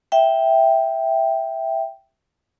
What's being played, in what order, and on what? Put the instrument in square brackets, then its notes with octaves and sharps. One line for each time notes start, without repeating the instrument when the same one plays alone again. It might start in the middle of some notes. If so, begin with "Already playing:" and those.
[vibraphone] E5 G5